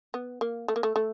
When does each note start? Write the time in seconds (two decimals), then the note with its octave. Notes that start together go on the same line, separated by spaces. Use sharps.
0.14 B3
0.41 A#3
0.68 A3
0.76 A#3
0.83 A3
0.96 A3